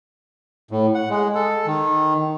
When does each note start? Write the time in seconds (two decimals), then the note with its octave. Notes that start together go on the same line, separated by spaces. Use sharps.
0.71 A2
0.95 F#5
1.10 G#3
1.35 A4
1.67 D#3